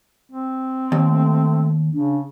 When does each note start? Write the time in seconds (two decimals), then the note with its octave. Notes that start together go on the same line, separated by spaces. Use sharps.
0.32 C4
0.92 D#2
1.07 A3
1.94 C#3 D4